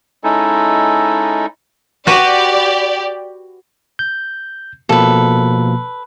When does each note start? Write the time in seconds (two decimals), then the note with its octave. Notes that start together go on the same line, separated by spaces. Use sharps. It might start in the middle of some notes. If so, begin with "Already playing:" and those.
0.24 G#3 C#4 D#4 E4 A4
2.07 F#4 G4 B4 D5
3.99 G6
4.89 B2 F3 A#3 A4 B4